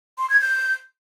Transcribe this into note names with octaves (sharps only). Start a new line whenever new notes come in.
C6
G#6
G6